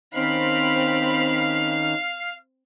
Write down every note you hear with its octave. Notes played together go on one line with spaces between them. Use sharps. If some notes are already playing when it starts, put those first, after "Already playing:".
D#3 C4 C#4 D#4 F5 B5